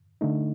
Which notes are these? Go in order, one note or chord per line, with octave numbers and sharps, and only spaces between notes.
D3 A3 D#4